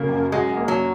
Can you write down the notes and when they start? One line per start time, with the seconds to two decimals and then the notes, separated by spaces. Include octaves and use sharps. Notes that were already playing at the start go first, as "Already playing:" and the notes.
Already playing: C#3 F#3 A#3
0.09 F#2
0.32 G#3 F#4
0.56 A#3
0.68 F#3